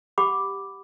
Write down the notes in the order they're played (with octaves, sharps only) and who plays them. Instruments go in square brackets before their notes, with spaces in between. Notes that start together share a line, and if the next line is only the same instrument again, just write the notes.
[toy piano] G4 F#5 B5 D6